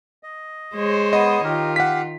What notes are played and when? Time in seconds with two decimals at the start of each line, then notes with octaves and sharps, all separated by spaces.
0.23 D#5
0.75 G#3 C5 C#5
1.13 B3 D#5 D#6
1.44 D#3 F4 G4 A#4
1.76 G4 F5 F#5 B6